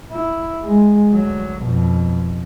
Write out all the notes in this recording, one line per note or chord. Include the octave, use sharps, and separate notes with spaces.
E4
G#3
D2 F#3
F2 B2